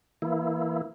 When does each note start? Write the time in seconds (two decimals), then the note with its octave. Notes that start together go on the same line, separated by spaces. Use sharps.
0.22 E3 A#3 E4